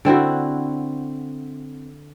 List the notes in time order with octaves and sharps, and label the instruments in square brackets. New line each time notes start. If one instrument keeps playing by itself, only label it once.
[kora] D3 C4 E4 F#4